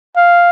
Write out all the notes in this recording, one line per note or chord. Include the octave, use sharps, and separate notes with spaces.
F5